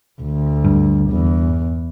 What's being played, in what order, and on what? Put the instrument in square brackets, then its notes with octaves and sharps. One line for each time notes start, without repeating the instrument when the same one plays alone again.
[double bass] D2
[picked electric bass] G2
[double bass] E2